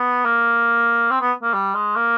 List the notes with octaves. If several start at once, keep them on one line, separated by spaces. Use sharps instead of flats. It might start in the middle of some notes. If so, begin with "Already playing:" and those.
Already playing: B3
A#3
C4
B3
A#3
G3
G#3
A#3